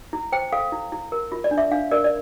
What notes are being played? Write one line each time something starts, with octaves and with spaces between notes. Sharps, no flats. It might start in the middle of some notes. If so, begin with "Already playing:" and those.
E4
C5 G5
A4 F5
E4
E4
A#4
F4
D5
D4
E5
D4 F5
A#4 D5
D5